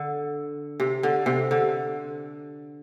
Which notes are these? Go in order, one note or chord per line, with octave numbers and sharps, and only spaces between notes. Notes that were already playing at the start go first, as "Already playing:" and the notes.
Already playing: D3
C3
D3
C3
D3